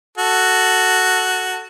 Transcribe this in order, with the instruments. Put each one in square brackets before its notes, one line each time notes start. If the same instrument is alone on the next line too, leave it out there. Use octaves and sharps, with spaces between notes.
[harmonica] F#4 A4